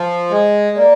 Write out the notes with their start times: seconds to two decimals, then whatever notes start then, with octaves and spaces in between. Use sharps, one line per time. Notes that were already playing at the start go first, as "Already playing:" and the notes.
Already playing: F3
0.31 G#3
0.76 A#3 D5